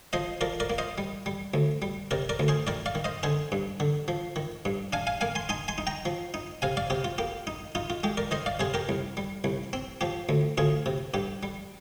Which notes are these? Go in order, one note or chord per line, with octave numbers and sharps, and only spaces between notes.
F3 C5 D#5
F3 A#4 D5
A#4 D5
A#3
C5 D#5
G3
G3
D2
G3
C3 A#4 D5
A#4 D5
D2
G#4 C5
D#3 A#4 D5
D5 F5
D#3
C5 D#5
D3 G#4 C5
G2
D3
F3
D#3
G2
D4 F5 G#5
F5 G#5
A#3 F5 G#5
G#5 C6
D#4 G#5 C6
G#5 C6
D#4
G5 A#5
F3
D#4
C3 F5 G#5
D5 F5
C3 G4
F4
A#3 G4
D#4
D#4 F4
F4
G#3 G4
A#4 D5
D#3 C5 D#5
D5 F5
C3 G#4 C5
G4 A#4
C2
G3
C2
C4
F3 G4
D2
D2 F4 G#4
C3
G2 G4
G3